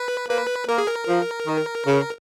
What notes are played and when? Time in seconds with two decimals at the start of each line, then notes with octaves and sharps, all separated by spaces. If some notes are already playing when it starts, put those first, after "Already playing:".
Already playing: B4
0.29 A#3 B4
0.68 A#3 A#4
0.78 G#4
0.87 A#4
1.07 F3
1.47 D#3
1.87 C#3